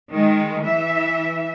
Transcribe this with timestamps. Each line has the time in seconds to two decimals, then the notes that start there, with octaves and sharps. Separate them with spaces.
0.12 D#3 G#3
0.65 E3 E5